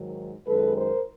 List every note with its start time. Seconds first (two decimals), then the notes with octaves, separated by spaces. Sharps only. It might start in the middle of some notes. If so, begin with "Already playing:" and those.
Already playing: G#2 D#3 F#3
0.46 F#2 D#3 G#3 A4 B4
0.74 A#4 C5